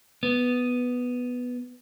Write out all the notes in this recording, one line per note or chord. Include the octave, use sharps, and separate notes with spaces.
B3